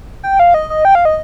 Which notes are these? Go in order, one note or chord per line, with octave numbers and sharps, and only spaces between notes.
G5
F5
D#5
D#5
G5
F5
D#5